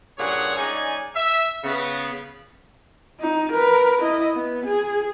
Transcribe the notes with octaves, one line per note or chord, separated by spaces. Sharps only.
G2 A#2 C#3 G#4 C#5 F#5
G#3 C#4 D#4 D5 G#5
E5
C#3 B3
D#4
A#4 B4
E4 D#5
B3
G#4